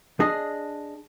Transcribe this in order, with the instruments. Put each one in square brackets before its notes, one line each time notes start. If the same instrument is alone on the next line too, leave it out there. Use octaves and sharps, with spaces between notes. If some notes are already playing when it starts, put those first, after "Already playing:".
[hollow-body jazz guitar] D4 G#4 D#5